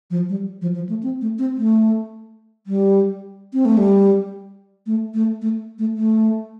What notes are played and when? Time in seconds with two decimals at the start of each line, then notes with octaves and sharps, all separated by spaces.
0.10 F3
0.29 G3
0.62 F3
0.75 F3
0.89 A3
1.03 C4
1.21 A3
1.38 C4
1.57 A3
2.67 G3
3.53 C4
3.65 A3
3.77 G3
4.86 A3
5.14 A3
5.42 A3
5.79 A3
5.97 A3